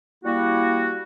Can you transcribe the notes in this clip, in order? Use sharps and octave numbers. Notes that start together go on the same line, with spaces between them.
G3 A#3 E4 F#4